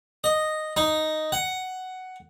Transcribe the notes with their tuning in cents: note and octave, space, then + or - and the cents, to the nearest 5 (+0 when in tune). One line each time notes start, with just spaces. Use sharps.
D#5 -5
D#4 +0
F#5 +10